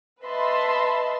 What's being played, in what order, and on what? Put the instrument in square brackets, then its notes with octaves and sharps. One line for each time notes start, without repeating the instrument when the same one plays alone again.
[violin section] B4 D#5 E5 A5 B5 C6